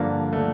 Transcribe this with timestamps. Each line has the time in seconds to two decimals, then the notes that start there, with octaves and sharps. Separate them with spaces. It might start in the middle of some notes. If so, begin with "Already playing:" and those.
Already playing: G2 D3 F3 A#3
0.33 D3 F3 A3